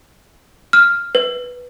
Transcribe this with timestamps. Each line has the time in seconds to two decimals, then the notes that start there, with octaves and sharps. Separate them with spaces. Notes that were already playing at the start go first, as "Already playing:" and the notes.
0.73 F6
1.15 B4